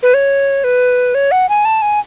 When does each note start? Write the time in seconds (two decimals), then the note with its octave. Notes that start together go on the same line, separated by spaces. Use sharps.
0.03 B4
0.14 C#5
0.64 B4
1.15 C#5
1.31 F#5
1.49 G#5
1.65 A5
1.82 G#5